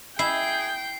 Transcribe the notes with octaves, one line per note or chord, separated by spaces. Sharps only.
E4 G#4 G5 C7